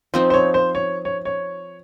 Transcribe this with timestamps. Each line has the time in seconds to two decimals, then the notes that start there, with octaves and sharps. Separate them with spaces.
0.14 F3 C4 D#4 C5
0.30 C5
0.34 C#5
0.54 C5
0.75 C#5
1.05 C#5
1.25 C#5